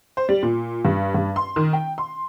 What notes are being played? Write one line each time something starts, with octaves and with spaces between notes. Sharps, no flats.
C5
G3
A#2
G2
G2
C6
D#3
G5
C6